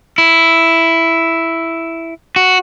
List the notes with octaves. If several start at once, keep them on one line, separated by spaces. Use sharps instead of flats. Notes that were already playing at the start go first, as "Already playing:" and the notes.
E4
F#4